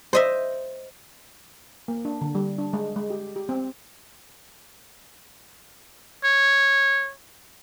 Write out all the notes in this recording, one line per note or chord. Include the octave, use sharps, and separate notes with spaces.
C5 D#5 E5
A#3
D4
D3
G3
D4
G#3
G#3
G4
G4
C4
C#5